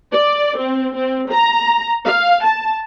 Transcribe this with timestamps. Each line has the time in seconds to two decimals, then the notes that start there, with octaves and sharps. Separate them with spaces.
0.12 D5
0.57 C4
0.94 C4
1.30 A#5
2.05 F5
2.44 A5